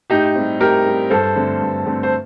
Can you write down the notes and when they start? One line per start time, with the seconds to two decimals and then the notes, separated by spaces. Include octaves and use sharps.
0.10 A2 D#4 G4
0.35 G3 C4
0.60 A2 G4 A#4
0.86 G3 C4
1.10 G2 A4 C5
1.35 D3 A3 C4
1.61 G2
1.85 D3 A3 C4
2.03 C5